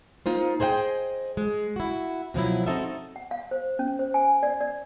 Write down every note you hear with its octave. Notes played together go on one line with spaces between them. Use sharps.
A#3 D#4 F4 C5
G#4 C5 D#5 F#5 G5
G#3
E4 F#4
B2 F3 F#3 E4
C4 D#4 F#4 A4 D#5 E5
F#5
F5
C5
C#4
C5
G#5
D5
D5